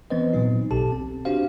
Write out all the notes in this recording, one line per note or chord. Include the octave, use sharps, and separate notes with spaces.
E3 B3 C4 B4 C5 D#5
A#2 F#3 D#4
B1 B2 G4 A4 A5
C4
D4 F#4 G4 C5 F5